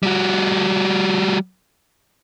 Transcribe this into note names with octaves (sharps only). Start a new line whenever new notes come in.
G3 F#4